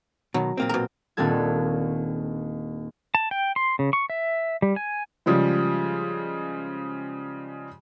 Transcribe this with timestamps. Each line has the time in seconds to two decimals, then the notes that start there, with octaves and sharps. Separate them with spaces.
0.34 B2 D#3 F#3
0.57 A#2 A#3 C4
0.69 B2 A#4
1.17 D#1 D#2 C4 D4 A4 G#6
3.15 A5
3.31 G5
3.56 C6
3.79 C#3
3.93 C#6
4.10 E5
4.62 G3
4.76 G#5
5.26 C#3 F3 G3 G#3